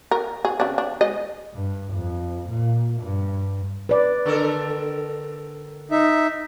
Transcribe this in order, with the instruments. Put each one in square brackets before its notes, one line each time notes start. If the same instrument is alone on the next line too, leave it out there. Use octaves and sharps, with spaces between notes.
[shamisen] A#4
G#4
C#3 D4
D4
G#3 D#5
[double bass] G2
F2
A#2
G2
[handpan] B4 D5
[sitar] D3 A4 A#4
[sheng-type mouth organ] D#4 E5